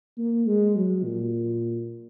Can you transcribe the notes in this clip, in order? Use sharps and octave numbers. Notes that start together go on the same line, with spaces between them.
A#3
G#3
F#3
A#2